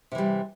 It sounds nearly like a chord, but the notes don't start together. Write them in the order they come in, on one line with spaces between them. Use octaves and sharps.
C3 E3 G3